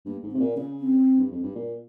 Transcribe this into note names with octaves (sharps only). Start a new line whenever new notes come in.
G2 A#3
G#2
C4
C3
A#2
C#3 C#4
C4
G2
F2
G2
A#2